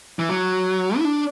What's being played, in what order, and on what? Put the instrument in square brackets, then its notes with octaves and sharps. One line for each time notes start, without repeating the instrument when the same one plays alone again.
[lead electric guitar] E3
F#3
E4
D4